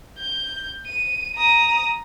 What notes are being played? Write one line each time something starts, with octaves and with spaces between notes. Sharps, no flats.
G6
D#7
A#5 D#6